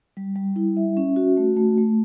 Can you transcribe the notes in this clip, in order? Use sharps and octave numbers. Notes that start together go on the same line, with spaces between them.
G3
G3
E4
E5
C#4
F#4
A3
A3
A3